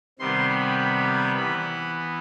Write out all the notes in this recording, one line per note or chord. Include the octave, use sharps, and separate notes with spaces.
C3 D#3 G3 B3 C6
B5
B5
E3 B3 B5